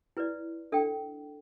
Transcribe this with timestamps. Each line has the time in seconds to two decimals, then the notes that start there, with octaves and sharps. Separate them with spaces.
0.17 E4 B4 D5
0.72 D4 A4 E5 G5